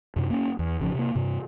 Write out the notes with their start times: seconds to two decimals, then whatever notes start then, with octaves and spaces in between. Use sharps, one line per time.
0.16 F#2 C3
0.30 A#3 C#4
0.59 E2
0.80 G#1 C#3 F3
0.94 C3 A#3
1.15 G2 C3